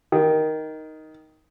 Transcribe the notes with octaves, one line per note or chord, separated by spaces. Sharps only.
D#3